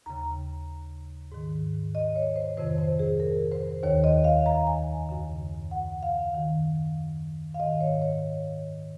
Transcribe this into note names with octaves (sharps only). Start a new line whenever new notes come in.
D#2 C#3 A#5
G#2 D#3
D#5
C#5
C5
F2 C3 D#3 C5
C5
G#4
A#4
C5
D#2 D#3 C#5
D#5
F5
A#5
G#5
F#2 C#3
F#5
F5
F#2 D#3
F5
G#2 D#3 D#5
C#5
C#5